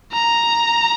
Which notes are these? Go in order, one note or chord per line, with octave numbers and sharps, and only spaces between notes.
A#5